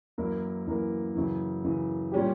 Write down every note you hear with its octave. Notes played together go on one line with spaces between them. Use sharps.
F#2 E3 A#3 E4 A#4
F#2 E3 A#3 E4 A#4
F#2 C#3 E3
F#2 C#3 E3
A#2 G3 C#4 G4